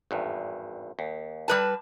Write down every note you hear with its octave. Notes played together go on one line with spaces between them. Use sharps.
G#1 E2 G2
D#2
G3 B4 A5